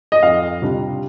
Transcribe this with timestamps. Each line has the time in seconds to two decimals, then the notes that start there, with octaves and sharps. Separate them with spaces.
0.12 D#5
0.23 F2 F5
0.62 C3 G3 D4 F4